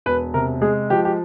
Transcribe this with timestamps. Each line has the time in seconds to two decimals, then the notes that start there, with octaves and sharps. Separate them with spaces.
0.06 E1 B4
0.34 C3 A#4
0.61 G#3 G#4
0.90 F3 G4
1.05 G4